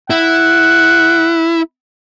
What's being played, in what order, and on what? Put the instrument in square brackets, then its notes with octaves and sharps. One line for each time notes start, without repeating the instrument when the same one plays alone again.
[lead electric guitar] E4 [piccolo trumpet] F#5